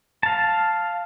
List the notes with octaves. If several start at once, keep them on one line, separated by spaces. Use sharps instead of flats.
F5 A5